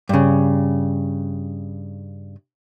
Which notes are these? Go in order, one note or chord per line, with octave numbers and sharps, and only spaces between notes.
G2 C#3